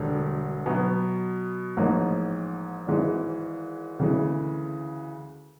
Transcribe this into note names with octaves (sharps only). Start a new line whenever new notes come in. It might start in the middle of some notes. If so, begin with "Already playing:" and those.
Already playing: E1 D2 D3 G3
B2 F#3 B3
A1 G#2 F3 A#3 D#4
G#1 G#2 E3 G#3
D2 C#3 E3 G#3